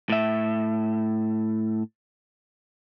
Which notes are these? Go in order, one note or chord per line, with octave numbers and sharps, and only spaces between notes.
A2 E5